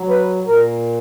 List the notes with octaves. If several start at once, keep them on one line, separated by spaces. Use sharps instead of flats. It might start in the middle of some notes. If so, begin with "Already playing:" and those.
Already playing: F#3
B4
A#2 A#4